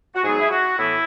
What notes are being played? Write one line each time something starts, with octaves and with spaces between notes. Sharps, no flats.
F#4
G#2 F#3 B3 G#4
E4
F#4
A2 E3 B3 E4